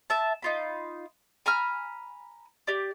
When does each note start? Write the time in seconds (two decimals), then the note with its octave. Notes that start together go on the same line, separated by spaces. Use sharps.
0.10 E5 A5
0.42 D#4 F4 B5
1.46 G#5 A#5 B5 F6
2.67 G4 D5